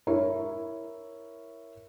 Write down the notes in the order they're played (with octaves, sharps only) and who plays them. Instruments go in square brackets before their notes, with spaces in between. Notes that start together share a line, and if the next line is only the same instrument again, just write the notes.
[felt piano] E4 A#4 C#5